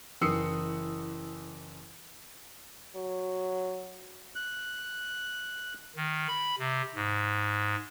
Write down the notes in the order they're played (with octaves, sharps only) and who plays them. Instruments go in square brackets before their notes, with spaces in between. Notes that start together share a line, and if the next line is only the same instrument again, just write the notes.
[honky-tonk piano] F#1 E3 D#6 E6 C7 C#7
[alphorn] F#3
[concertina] F#6
[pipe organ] D#3
B5
C3
G#2